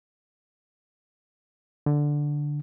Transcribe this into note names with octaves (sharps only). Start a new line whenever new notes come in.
D3